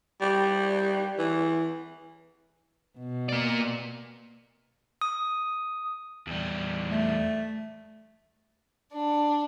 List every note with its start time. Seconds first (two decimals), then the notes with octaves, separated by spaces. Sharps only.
0.21 G3
1.18 E3
2.98 B2
3.29 A#3 D5
5.01 D#6
6.27 E2 G3
6.91 A3
8.92 D4